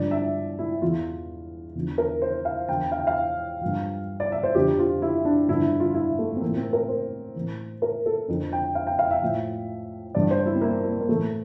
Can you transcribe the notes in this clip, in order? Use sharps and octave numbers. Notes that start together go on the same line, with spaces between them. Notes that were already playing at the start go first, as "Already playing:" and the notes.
Already playing: G2 D3 F3 D5
E5
E4
E2 E3 F4
E2 D3 F3
A#4
C5
F5
E2 D3 F3 G5
F5
G5
F5
G2 F3
D5
E5
C5
F2 D3 F3 G4
F4
E4
D4
G2 D3 F3 E4
F4
E4
A3
C4
E3 A#3
A2
C4
A#4
C5
A2 E3
A#4
A4
F2 D3 F3
G5
F5
G5
F5
E5
A2 F3
G2 E3 D5
C5
E4
C4
A#3
A#3
A#3
A2 E3 A3